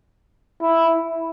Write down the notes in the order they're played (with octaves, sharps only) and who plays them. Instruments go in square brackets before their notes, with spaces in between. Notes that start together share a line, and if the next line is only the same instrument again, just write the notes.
[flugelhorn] E4